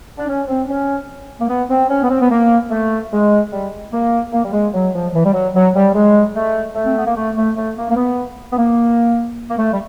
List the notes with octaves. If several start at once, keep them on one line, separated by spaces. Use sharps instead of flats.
D4
C#4
C4
C#4
A#3
B3
C4
C#4
B3
C4
B3
A#3
A3
G#3
G3
A#3
A#3
G3
G#3
F#3
F3
E3
G3
F#3
F#3
G3
G#3
A3
A3
C4
B3
A#3
A3
A3
A3
A#3
A#3
B3
B3
A#3
A#3
A3
G3